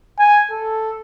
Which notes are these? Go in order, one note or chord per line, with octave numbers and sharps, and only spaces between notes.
G#5
A4